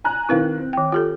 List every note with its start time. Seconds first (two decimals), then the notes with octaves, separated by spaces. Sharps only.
0.04 G#5 A#5 F#6
0.29 D#3 C4 E4 B4 F5
0.58 C4
0.73 D#3 G5
0.92 F4 G4 A4